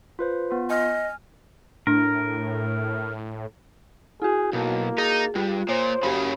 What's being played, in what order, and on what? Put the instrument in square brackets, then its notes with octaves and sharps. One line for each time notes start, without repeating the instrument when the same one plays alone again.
[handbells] F4 B4 C5
B3 F4
[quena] D#5 [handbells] G#5 F6
[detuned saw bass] A2 [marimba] D4 [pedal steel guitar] A#4
[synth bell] E4 F#4 [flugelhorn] G#4
[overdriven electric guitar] B1 [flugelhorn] A#3
[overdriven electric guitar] D#4 [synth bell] G#4
[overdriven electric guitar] G2 [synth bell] F4
[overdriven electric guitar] A#2 [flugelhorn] C5 [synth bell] C#5
[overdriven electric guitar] F#2 C#3 [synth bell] G4 B5